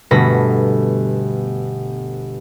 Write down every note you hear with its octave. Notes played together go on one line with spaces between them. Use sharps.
G1 B2 A3 B5 A#6